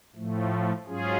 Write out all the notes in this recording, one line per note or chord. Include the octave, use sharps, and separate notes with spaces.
A2 F3 A3
G#2 F#3 C#4 F4 G#4